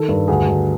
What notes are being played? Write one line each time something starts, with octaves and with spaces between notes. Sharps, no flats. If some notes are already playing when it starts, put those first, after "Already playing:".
Already playing: D#3 A4
G2
D2 G#4
D2